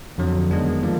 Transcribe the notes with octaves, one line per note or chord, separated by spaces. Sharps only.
F2 D3 F#3
D#3 G#3 B3 D4
D3 F3 A#3